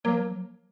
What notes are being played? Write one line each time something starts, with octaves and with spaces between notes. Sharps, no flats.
F#3 A#3
F3
F#3